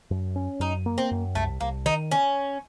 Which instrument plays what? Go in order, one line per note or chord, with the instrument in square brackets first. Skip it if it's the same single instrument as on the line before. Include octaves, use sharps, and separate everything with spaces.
[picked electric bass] F#2
C#4
[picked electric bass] F#2 [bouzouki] D#4
[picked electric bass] A#3
[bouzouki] C4
[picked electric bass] F#2
[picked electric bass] C2 [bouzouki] A3
[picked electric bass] C2 [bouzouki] A#3
[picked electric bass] D#3 [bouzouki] D#4
[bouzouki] C#4